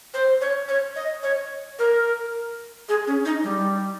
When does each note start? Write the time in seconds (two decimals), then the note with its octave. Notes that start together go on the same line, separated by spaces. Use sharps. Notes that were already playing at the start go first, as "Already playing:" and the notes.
0.14 C5
0.41 C#5
0.69 C#5
0.96 D#5
1.23 C#5
1.79 A#4
2.89 G#4
3.07 C#4
3.25 D#4
3.44 G3